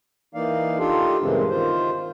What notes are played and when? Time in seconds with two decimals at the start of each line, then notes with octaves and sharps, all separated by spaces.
0.35 E3 A#3 D#4 D5 F5
0.79 D4 D#4 F4 G4 A4
1.22 G2 A#2 C#3 E3 G#3 C4
1.50 D#3 F4 C5